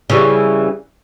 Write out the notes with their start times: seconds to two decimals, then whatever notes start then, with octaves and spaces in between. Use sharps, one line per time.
0.10 C#3 E3 G3